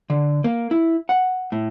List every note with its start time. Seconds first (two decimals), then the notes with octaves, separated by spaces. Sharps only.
0.10 D3
0.44 A#3
0.71 E4
1.09 F#5
1.52 A2